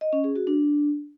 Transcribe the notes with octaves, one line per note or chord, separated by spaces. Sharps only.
D#5
C#4
G#4
F#4
D4